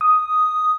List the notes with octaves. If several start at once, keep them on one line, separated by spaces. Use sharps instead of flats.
D#6